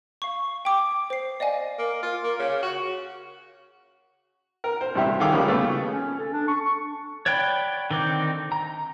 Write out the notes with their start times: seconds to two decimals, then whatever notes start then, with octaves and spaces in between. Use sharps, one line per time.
0.22 F5 C#6
0.65 G5 D6 D#6
1.10 C5 C7
1.40 D5 D#5 F5 G#5
1.79 A#3
2.02 F4
2.23 A#3
2.39 C#3
2.63 F#4
4.64 A#4
4.81 C5
4.95 A1 G2 C3 G4 E5
5.20 D#3 G#4 A4 F5 G5 D6
5.32 C#3 F3 G3 A#3 G5
5.48 C#3 A3 B3
5.89 C#4
6.19 A4
6.33 D4
6.48 C#6
7.26 C#5 D5 F#5 G5 B5
7.91 D3 D#3 C4 D#4 D6
8.52 A#5